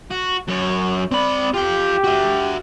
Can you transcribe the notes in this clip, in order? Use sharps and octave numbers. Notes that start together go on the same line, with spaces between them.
F#4
F#2 C#5
C4 D5 B5
F4 G4 G5
F#4 E5